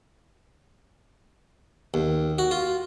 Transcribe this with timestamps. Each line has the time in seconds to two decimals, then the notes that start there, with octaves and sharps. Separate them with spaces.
1.94 D#2
2.38 F#4
2.51 F4